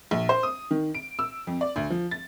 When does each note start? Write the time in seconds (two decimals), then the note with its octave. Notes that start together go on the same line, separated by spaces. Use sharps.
0.11 A#1
0.29 C5
0.43 D#6
0.71 D#3
0.94 D7
1.19 E6
1.47 F2
1.61 D5
1.76 D2
1.90 F3
2.11 A6